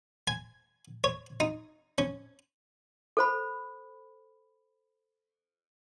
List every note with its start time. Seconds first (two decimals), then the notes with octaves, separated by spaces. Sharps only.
0.28 G#5
1.04 C#5
1.40 D#4
1.98 C#4
3.17 A4 C5 B5